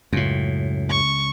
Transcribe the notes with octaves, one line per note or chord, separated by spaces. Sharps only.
C#2 F#2 A2
C#6